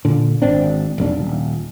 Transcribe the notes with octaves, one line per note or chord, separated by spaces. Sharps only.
A#2 D3
G#1 C4 D4
F1 B1 D4
D#1